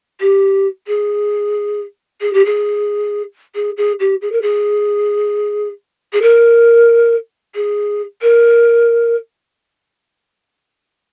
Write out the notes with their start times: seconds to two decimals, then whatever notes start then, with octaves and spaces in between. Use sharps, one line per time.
0.20 G4
0.87 G#4
2.21 G#4
2.33 G4
2.45 G#4
3.55 G#4
3.77 G#4
4.00 G4
4.22 G#4
4.32 A#4
4.42 G#4
6.13 G#4
6.22 A#4
7.55 G#4
8.22 A#4